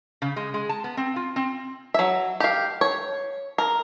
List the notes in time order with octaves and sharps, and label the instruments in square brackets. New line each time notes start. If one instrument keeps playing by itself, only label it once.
[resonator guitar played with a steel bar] C#3
G#3
G#3
A5
B3
C4
F4
C4
[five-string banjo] F#3 E5
G4 F5
C#5
A#4